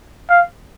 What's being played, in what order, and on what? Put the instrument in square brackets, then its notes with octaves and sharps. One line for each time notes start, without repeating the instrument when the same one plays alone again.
[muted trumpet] F5